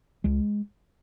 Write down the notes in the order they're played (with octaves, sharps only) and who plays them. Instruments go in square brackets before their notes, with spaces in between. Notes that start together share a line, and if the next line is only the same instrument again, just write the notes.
[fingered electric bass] C#2 G#3